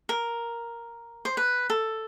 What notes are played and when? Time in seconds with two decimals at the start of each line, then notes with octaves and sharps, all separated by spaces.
0.09 A#4
1.25 C5
1.37 B4
1.70 A4